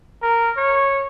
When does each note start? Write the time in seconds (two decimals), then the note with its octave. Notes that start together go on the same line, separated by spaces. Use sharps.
0.22 A#4
0.57 C#5